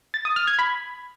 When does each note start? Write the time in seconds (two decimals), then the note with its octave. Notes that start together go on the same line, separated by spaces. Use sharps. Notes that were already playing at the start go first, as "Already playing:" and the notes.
0.14 A6
0.25 D#6
0.36 F6
0.47 G#6
0.59 B5